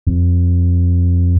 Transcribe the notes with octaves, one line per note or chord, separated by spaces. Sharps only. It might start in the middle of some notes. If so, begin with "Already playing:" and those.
F2